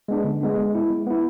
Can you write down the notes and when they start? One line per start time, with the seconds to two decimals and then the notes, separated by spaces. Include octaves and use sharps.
0.08 G#3 B3 D4
0.24 D3
0.41 G#3 B3 D4
0.58 G#3
0.75 B3 E4
0.90 G#3
1.07 B3 E4